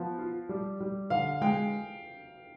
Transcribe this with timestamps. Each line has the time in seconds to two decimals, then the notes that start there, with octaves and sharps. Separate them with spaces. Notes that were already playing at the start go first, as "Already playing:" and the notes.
Already playing: F3 B3
0.19 F4
0.49 G3
0.80 G3
1.10 D3 F5
1.41 G#3 G5